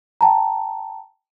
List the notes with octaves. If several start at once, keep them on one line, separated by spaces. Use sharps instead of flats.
G5 A5 A#5